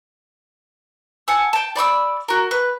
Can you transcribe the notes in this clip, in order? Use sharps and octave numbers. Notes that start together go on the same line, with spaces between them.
F#5 G#5 A5 E6
G5 A5
D5 B5 D6 E6
F#4 A#4
B4